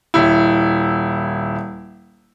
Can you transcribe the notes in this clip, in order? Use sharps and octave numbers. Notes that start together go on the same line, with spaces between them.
D#1 E4